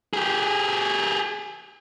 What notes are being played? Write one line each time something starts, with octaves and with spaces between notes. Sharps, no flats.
G4 G#4